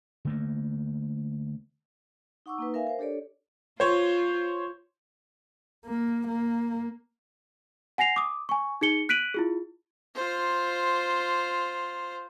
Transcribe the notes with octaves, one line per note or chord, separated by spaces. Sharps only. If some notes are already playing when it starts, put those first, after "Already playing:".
D3 A3 A#3
D#4 F#5 C#6 D6 E6
A#3 D#4 B4
A#4 E5 F5 G#5
A#4 C5
D4 G4 A4 C#5 D5
F4 C5 C#5
A#3
A#3
F#5 G#5 A#6 C7 F7
D6 D#6
G#5 C#6
D#4 G#4 C#7 G7
F#6 B6 D7 D#7 F#7
E4 F4 G#4
F4 C5